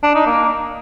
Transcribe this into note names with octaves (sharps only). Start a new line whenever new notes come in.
D4
D#4
A#3